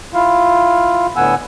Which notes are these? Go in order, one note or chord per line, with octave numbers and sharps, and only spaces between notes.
E4 F4 F5
A2 D3 B3 F#5 G#5 E6